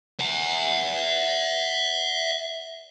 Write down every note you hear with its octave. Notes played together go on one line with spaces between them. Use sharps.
E5 F#5